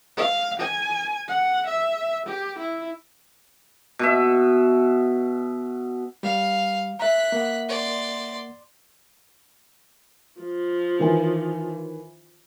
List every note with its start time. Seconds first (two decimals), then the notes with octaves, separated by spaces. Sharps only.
0.17 F5
0.60 G#5
1.28 F#5
1.67 E5
2.26 G4
2.59 E4
3.99 B2 E5
6.23 G3 F5
7.00 E5 A#5 F#6 B6
7.32 A#3 F#5
7.69 D5 C6
10.40 F3
10.99 D#3 E3 G#5